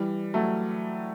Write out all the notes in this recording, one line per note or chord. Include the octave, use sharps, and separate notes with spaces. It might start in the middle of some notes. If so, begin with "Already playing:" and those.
Already playing: E3 G3
F#3 A3